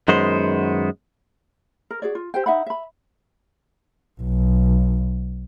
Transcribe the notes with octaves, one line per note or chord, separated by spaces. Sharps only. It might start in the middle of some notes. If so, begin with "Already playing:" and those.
F#2 D#3 G#3 B3 C5
A#4
F#4 G#4 C#5 D5
F4
G4 C5 G5
D#4 E5 F#5 B5
E5 B5
B1